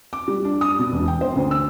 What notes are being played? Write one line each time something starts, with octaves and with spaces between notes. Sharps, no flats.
D6
G3
D4
D#6
B2
E1
G5
C5
D2
E6